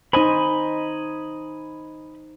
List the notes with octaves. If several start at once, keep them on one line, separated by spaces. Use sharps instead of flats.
D#4 C5 D#5 G#5 B5